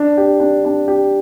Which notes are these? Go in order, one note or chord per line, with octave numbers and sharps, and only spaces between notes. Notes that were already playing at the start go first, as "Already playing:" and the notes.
Already playing: D4
G4
D4
D4
G4